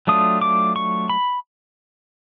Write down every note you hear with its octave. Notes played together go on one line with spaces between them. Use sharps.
F#3 A3 D4 F4 D#6
D6
C#6
B5